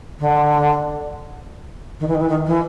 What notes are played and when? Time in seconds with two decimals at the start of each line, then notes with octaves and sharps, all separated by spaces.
0.20 D3
2.00 D#3
2.08 E3
2.15 D#3
2.21 E3
2.29 D#3
2.46 E3